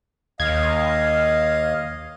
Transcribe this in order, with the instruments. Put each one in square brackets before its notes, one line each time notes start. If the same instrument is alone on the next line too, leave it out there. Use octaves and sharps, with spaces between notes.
[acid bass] D#2 [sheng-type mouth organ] D#5 [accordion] F5 [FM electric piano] G#6